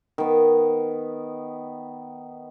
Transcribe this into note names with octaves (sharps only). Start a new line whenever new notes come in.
D#3 B3